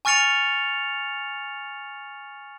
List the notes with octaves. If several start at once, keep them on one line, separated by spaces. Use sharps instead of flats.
G#5 C#6 F6 A6 C#7 F7